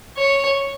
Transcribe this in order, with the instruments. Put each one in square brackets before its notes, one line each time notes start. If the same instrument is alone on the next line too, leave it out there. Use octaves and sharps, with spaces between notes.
[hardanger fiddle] C#5